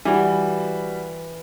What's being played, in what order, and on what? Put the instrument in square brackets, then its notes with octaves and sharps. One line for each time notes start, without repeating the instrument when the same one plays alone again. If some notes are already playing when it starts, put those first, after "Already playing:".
[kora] E3 [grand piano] G3 F#4